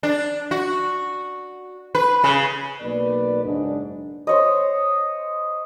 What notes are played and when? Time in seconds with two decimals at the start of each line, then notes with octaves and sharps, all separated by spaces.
0.03 D4
0.51 F#4
1.95 B4
2.24 C#3
2.81 B1 A#3 B4 D5
3.44 F#1 G#2 D4
4.27 C5 C#5 D#5